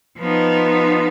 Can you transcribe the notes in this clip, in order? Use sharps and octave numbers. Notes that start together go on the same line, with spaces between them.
F3 B3 D#4